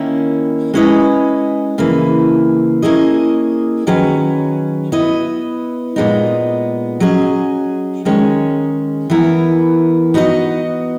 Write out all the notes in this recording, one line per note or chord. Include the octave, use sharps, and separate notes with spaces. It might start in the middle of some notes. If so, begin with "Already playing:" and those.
Already playing: D#3 A#3 C#4 E4
G#3 C#4 E4 B4 D#5
C#3 E3 A#3 E4 B4
A#3 C#4 E4 G#4 D#5
D#3 F#3 C#4 G#4 B4
B3 E4 B4 D#5
A#2 G#3 B3 D#4
F#3 C#4 G#4 D#5
D#3 G#3 C#4
E3 B3 E4 A#4
B3 D#4 F#4 A#4 D#5